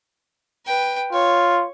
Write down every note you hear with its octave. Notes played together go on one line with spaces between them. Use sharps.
B4 G5
F4 C#5